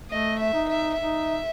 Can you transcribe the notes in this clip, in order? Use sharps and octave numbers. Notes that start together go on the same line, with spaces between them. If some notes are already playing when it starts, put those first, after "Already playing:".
A3 D#5
E5
D#4
E5
D#4 E5